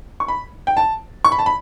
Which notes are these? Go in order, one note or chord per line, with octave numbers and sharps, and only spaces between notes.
C#6
B5
G5
A5
C#6
B5
A5
B5